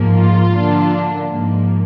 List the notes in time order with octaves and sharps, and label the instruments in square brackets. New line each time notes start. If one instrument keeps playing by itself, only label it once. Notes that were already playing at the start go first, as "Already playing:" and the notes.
Already playing: [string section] G#2 F3 A#3
F4
D3 F3 A#3 D4
G#2 F3 A#3